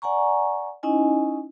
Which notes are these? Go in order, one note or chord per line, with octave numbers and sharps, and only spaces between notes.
D5 F#5 G#5 A#5 C#6
C#4 D#4 E4 D#5 G#5